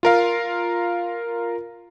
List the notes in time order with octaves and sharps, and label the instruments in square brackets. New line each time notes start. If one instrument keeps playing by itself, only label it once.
[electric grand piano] F4 A#4 F5